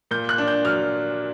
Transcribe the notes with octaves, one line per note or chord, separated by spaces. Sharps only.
A#2 G6
F#6
D4
G6
F#3 F6